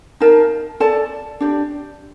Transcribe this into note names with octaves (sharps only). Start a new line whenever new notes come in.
D#4 A#4 F5 A5
A4 D5 A5
D4 G4 D5